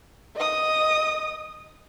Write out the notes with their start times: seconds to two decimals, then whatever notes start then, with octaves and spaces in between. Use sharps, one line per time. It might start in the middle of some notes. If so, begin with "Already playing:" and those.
0.35 D#5 D#6